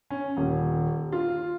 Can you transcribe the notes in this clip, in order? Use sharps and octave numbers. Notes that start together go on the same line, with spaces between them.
C#4
D#1
F4